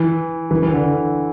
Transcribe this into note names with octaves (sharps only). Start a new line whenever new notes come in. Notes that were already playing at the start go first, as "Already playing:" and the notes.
Already playing: E3
E3
E3
D3
D3